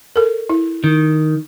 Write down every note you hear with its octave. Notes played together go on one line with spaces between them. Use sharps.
A4 A#4
E4
D#3